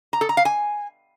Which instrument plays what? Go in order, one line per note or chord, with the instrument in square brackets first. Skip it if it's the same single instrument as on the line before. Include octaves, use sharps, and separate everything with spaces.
[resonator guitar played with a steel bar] A#5
A4
A#5
F5
G#5